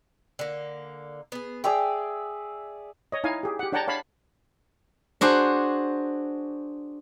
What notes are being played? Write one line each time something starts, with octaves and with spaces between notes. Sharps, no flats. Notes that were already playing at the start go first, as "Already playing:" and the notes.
D3 A#3
B3 G#4
G#4 D5 E5 G5 A#5
C#5 D#5
D#4 E4 C#5 F5 G#5
G4 G#4
G4 F#5
D4 C#5 F#5 G5 A5 A#5
C#5 F5 A5 B5
D4 F#4 G#4 C5